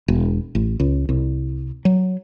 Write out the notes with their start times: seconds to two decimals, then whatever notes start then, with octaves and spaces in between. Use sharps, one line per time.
0.08 E1
0.55 A1
0.80 C#2
1.09 C2
1.85 F#3